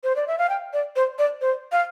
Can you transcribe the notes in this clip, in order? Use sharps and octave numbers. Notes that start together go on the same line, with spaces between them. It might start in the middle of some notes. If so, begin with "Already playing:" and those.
C5
D5
E5
F5
G5
D5
C5
D5
C5
F5